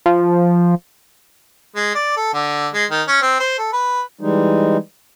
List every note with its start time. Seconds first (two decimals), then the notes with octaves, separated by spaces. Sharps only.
0.06 F3
1.75 G#3
1.95 D5
2.17 A4
2.34 D3
2.74 G#3
2.91 D#3
3.08 C#4
3.22 C4
3.40 C5
3.58 A4
3.73 B4
4.21 E3 G3 G#3 D#4